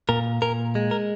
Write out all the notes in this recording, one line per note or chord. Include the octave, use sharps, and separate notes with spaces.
A#2 A#4
A#2 A#4
G#3
A#4